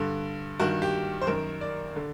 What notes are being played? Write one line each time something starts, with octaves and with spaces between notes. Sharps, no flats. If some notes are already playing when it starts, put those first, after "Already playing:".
Already playing: G2 D3
G2 D#3 F#4
G4
C5
F#2 D#3 A#4
D5
D3